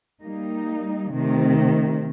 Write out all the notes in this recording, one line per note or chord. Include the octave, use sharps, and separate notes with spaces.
G3 A#3 D#4
C3 D#3 A3